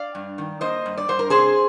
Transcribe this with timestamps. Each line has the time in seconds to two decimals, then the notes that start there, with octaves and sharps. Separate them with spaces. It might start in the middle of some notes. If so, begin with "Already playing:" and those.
Already playing: D5 F5
0.15 G2
0.38 D#3
0.61 A#3 C5 D#5
0.86 G2
0.97 D5
1.08 G2 C5
1.19 A#4
1.30 C3 G#4 C5